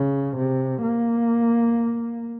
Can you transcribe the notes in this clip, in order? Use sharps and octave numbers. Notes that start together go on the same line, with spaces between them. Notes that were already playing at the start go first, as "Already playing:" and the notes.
Already playing: C#3
C3
A#3